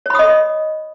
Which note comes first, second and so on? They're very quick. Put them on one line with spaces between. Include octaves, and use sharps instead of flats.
C#5 B5 D#6 D#5